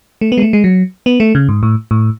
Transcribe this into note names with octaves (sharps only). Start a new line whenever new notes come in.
A3
B3
G#3
A3
G#3
F#3
B3
A3
C#3
G#2
A2
A2